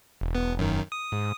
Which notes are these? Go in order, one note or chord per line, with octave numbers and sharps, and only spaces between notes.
E1
B3
F#2 D#3
D#6
G#2